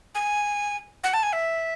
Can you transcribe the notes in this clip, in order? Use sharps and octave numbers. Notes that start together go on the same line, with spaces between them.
G#5
F#5
A5
G#5
E5